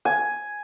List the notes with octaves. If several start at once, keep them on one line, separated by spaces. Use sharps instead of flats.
G#5